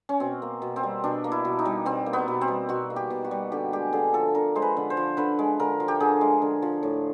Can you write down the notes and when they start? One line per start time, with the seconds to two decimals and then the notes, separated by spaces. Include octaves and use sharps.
0.09 C#4
0.20 B2 C4
0.42 A#3
0.62 B2
0.76 C4
0.83 G3
1.04 B2 D4
1.24 A#3
1.32 E4
1.45 B2
1.59 D#4
1.65 G3
1.86 B2 C4
2.06 A#3
2.13 B3
2.28 B2
2.41 C4
2.48 G3
2.69 B2 F#4
2.90 A#3
2.96 G4
3.10 B2
3.24 F#4
3.31 G3
3.52 D3 G4
3.72 G#3 G4
3.93 D3 G#4
4.14 F3 A4
4.35 D3 A#4
4.55 G#3 C5
4.62 B4
4.77 D3
4.90 C5
4.97 F3
5.17 D3 B4
5.39 G#3
5.60 D3 A#4
5.80 F3
5.88 G4
6.00 D3 G#4
6.21 G#3
6.42 D3
6.62 F3
6.83 A2